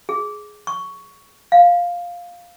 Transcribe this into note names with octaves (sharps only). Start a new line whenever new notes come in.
G#4
C#6
F5